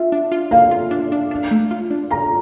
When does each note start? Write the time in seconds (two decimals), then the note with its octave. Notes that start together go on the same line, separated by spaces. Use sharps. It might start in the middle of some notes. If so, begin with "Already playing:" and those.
Already playing: D4 F4 E5
0.12 D4
0.32 F4
0.51 A#3 F5
0.71 F4
0.91 D4
1.12 D4
1.31 D4
1.51 A3
1.71 F4
1.91 D4
2.11 F4 A#5